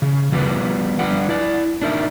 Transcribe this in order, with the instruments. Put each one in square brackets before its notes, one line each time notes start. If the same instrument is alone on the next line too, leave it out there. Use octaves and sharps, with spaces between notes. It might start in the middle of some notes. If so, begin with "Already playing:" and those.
[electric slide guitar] C#3
F3 G3 B3 B4
D3 G3 B4 D5 F#5
E4 D5
D4 D#4 A#4 E5